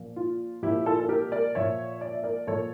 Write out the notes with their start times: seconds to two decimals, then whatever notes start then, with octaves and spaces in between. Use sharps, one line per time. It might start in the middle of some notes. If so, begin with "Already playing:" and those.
Already playing: A#2 F3 A#3
0.16 F4
0.62 A#2 F3 A#3 E4 G4
0.86 F4 A4
1.00 A4
1.09 G4 A#4
1.32 A#4 D5
1.55 A#2 F3 A#3 C#5 E5
2.01 D5
2.12 E5
2.23 A#4 D5
2.47 A#2 F3 A#3 A4 C#5